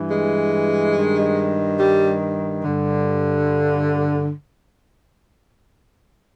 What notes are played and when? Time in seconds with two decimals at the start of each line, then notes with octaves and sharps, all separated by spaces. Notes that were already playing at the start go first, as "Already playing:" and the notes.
Already playing: G2 E3
0.11 G#3
0.96 G2 D#3
1.80 G3
2.63 G2 D3